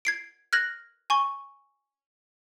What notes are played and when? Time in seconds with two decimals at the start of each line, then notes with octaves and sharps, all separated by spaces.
0.05 G#6 C7 D7
0.53 F6 F#6 G#6 A#6 F#7
1.10 G#5 C#6 G7